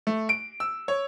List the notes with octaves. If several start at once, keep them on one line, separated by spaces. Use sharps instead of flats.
A3
D7
E6
C#5